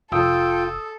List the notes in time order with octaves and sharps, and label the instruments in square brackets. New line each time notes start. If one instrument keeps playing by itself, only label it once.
[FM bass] F1 [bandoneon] F4 G5 [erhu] A4 [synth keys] D#6 E6